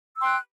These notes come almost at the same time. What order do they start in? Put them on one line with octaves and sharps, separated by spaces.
E6 C6 G5 F#6